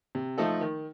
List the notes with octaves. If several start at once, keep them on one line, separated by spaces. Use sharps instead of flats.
C3
F3 A3 D#4 A4
D#3